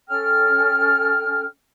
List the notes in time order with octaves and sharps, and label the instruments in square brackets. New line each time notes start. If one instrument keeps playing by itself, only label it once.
[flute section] C#4 A4 G5 F6